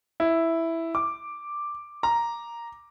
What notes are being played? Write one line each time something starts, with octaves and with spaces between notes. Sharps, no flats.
E4
D6
A#5